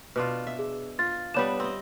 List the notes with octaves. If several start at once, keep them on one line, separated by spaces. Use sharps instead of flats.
B2 D4 F4 B4
E5
G#4
F4 A6
G3 B3 D4 B4 C#5 E7
C4 D#5